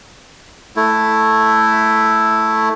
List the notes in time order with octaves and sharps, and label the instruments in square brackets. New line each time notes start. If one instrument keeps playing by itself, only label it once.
[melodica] A3 E4